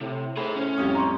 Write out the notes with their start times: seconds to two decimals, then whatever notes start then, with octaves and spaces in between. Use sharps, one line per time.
0.01 A2 C3
0.37 A2 G#4 C5 B5
0.56 C#4
0.78 A1 F2 G3 D#6
0.95 A#5 C6 C#6